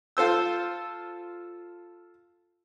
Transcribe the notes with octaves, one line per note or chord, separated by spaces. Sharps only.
F4 A4 C5 E6